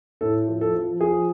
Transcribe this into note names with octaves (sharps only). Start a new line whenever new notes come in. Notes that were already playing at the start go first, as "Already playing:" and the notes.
A2 A4
F3
A4
F3
F3 G#4